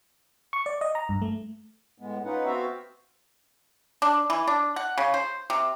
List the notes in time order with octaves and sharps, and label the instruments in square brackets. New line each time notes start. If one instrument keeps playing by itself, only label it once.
[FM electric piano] C#6
D5
D#5
A#5
G2
A3
[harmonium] A2 G#3 B3
C#4 D#4 F4 B4 F#5
B3 C4 F#4 E5 F5 G5
[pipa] D4
E3
D4
F#5
C#3
C5
C3